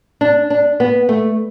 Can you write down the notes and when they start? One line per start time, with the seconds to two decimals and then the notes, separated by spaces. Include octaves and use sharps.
0.21 D4
0.50 D4
0.80 B3
1.09 A3